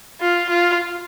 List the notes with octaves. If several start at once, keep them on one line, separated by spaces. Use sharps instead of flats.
F4
F4